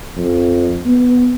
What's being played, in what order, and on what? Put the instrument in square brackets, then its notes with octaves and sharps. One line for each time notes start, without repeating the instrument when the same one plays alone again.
[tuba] F2
B3